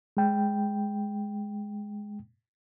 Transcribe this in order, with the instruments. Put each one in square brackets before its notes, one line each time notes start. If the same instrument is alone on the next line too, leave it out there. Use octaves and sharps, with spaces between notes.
[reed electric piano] G#3 G5